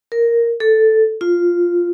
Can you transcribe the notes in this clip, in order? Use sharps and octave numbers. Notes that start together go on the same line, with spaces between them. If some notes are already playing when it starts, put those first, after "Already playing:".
A#4
A4
F4